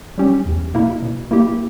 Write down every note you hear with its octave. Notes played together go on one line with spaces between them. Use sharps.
G3 C#4 G4
E2
B2 A#3 E4
B2
A#3 E4 G4